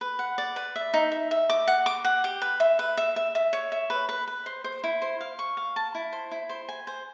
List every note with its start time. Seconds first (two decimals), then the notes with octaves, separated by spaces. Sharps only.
0.01 B4
0.19 F#5
0.38 D5
0.56 B4
0.76 E5
0.94 D#4
1.12 E5
1.31 E5
1.50 D6
1.68 F#5
1.86 D6
2.04 F#5
2.24 G4
2.42 B4
2.60 E5
2.79 B4
2.97 E5
3.16 E5
3.35 E5
3.53 C#5
3.72 E5
3.90 B4
4.09 B4
4.27 B4
4.46 C5
4.64 C5
4.84 E4
5.02 C5
5.21 F5
5.39 C#6
5.57 F5
5.76 A5
5.95 E4
6.13 C5
6.31 E4
6.50 C5
6.69 G#5
6.87 C5